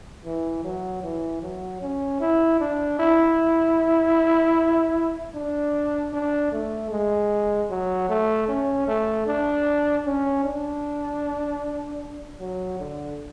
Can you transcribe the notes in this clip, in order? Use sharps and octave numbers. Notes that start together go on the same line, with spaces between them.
E3
F#3
E3
F#3
C#4
E4
D4
E4
D4
D4
A3
G#3
F#3
A3
C#4
A3
D4
C#4
D4
F#3
D3